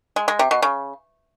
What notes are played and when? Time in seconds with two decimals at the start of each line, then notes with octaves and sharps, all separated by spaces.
0.16 G#3
0.28 G#3
0.39 C3
0.51 B2
0.62 C#3